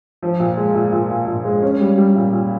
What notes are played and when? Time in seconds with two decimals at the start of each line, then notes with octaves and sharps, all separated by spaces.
0.23 F3
0.40 A#2
0.57 G#3
0.75 A#2
0.93 A#2
1.10 A#2
1.27 A#2
1.45 G#3
1.62 C#4
1.80 G3
1.97 G3
2.16 A#2
2.33 A#2